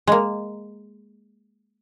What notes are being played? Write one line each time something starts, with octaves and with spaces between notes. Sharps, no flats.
G#3 A#3